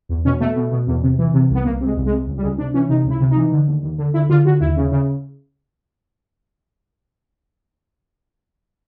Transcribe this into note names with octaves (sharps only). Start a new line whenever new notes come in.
E2
B2 C#4
B2 A3
B2
B2
E2
C3
E3
C3
C2
B3
C2 A#3
C3
G#3
C2
G#3
C3
C#2
G3
C#2 G#3
C3 D4
E3 C#4
C3 D#4
C#2
E4
C3
D#4
E3
D3
D#2
D#2
D3
D3 E4
D3 F4
D3 F#4
D#2 E4
C#3
C#3